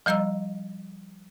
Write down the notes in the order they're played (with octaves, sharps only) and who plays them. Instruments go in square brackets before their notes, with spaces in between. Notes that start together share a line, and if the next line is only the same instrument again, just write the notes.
[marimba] F3 G3 D#5 A#5 E6